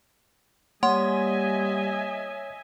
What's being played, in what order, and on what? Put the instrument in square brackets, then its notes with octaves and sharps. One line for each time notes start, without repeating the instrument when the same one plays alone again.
[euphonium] G3 [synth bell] A#3 F#5 C6 [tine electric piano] C#5 [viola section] D#5 E5 G#5